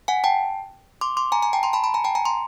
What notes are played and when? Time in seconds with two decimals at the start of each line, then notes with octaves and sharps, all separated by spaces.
0.08 F#5 G#5
0.24 G5 A5
1.01 C6 D6
1.17 C6 D6
1.32 G#5 A#5
1.42 G#5 A#5
1.53 G5 A5
1.63 A#5 C6
1.73 A5 B5
1.84 A5 B5
1.94 G#5 A#5
2.04 G5 A5
2.15 G#5 A#5
2.25 A#5 C6